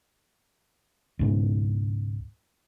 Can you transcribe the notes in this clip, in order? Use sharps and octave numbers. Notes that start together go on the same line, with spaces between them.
C#2 G#2 B2